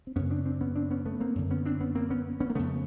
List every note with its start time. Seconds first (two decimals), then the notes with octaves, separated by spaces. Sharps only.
0.07 C4
0.16 F#2 C#3 B3 C#4
0.31 C4 D4
0.46 C4 D4
0.61 B3 C#4
0.76 C4 D4
0.91 B3 C#4
1.06 A3 B3
1.20 A#3 C4
1.35 F#2 D3
1.51 B3 C#4
1.65 C4 D4
1.81 B3 C#4
1.95 A#3 C4
2.10 B3 C#4
2.40 B3 C#4
2.50 A#3
2.55 F2 C#3 A3 B3